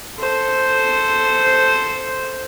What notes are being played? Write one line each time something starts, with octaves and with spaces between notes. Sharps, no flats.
A4 C5